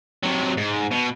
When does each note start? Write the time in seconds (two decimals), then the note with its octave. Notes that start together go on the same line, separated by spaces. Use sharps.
0.23 C3 F#3
0.58 G#2
0.91 B2